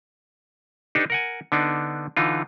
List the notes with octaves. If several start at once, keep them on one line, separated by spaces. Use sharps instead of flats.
D4 D#4 G4 A4 B4
A#4 F#5 G#5
D3 B3 D4 D#4
D3 E3 D#4 F4